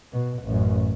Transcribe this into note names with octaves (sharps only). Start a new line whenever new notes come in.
B2
A1 F#2